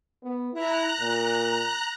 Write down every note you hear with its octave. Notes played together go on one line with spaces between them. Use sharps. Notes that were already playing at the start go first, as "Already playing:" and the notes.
B3
E4 A#5 F#6
A#2